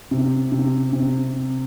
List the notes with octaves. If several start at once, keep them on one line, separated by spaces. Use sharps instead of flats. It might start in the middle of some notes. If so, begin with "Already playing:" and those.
C3
C3
C3